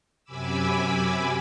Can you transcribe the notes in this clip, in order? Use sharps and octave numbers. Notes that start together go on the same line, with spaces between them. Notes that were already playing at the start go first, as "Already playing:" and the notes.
F#2 C3 G#5 B5 D6 E6